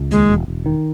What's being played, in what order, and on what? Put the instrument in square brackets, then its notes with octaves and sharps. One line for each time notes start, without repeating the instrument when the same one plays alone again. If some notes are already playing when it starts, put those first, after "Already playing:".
Already playing: [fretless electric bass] C#2
[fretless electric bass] D#2 [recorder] G#3
[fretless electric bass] E1
E1
D#3